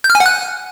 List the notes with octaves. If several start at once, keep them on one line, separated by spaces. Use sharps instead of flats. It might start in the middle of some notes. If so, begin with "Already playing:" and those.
G6
F6
G#5
F#5
F#6